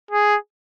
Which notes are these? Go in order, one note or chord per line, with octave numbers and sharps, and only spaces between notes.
G#4